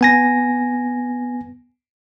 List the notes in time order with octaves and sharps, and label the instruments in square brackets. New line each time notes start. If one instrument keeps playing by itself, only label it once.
[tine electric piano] B3 G#5 A#6